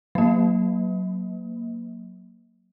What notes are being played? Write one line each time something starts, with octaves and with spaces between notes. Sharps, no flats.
F#3 A#3